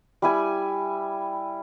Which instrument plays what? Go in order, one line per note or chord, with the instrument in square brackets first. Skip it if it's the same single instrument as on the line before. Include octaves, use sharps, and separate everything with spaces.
[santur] G3 E4 G#5